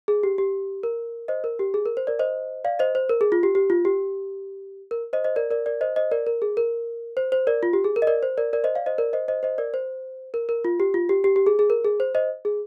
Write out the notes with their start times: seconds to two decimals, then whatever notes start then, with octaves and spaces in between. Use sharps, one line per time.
0.08 G#4
0.23 G4
0.38 G4
0.83 A#4
1.28 C5 D#5
1.44 A#4
1.59 G4
1.74 G#4
1.86 A#4
1.97 C5
2.07 A#4 D5
2.19 C5 D#5
2.65 D5 F5
2.79 C5 D#5
2.95 C5
3.09 A#4
3.21 G#4
3.32 F4
3.43 G4
3.55 G4
3.70 F4
3.85 G4
4.91 A#4
5.13 C5 D#5
5.24 C5 D#5
5.36 A#4 D5
5.50 A#4 D5
5.66 A#4 D5
5.81 C5 D#5
5.96 C5 D#5
6.11 A#4 D5
6.27 A#4
6.42 G#4
6.57 A#4
7.17 C5
7.32 C5
7.47 A#4 D5
7.63 F4
7.73 G4
7.84 G#4
7.96 A#4
8.02 D#5
8.07 A#4 D5
8.23 C5
8.38 A#4 D5
8.53 A#4 D5
8.64 C5 D#5
8.75 D5 F5
8.86 C5 D#5
8.98 A#4 D5
9.13 C5 D#5
9.28 C5 D#5
9.43 C5 D#5
9.58 A#4 D5
9.74 C5
10.34 A#4
10.49 A#4
10.65 F4
10.80 G4
10.94 F4
11.09 G4
11.24 G4
11.36 G4
11.46 G#4
11.59 G#4
11.70 A#4
11.85 G#4
12.00 C5
12.15 C5 D#5
12.45 G#4